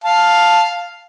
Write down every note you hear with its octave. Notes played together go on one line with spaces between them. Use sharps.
F5 A5